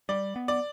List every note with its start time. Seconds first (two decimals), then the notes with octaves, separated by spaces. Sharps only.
0.09 G3 D5
0.36 B3
0.48 D5